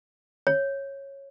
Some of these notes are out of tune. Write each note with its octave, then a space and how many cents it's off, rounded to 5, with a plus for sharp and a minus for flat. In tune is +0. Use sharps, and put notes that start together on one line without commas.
C#5 -10